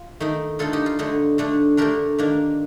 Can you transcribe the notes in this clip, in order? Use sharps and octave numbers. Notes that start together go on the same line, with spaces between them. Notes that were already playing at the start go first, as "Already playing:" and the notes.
Already playing: F4
D#3 A3 D#4
D3 A3 D#4 F4 A4
D#4 G4
F4
D3 A3 D#4
D3 A3 D4
D3 A3 D4 G4 A#4
D#3 A#3 D4